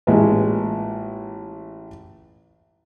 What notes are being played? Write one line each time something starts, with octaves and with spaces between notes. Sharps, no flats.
A1 A#2 G#3 B4